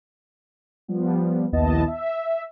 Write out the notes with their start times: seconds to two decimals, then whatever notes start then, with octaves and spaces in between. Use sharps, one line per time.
0.88 F3 G3 B3
1.52 A#1 D#2 B3 E4 D#5 A5
1.88 E5